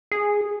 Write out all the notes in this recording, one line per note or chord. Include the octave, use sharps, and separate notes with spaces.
G#4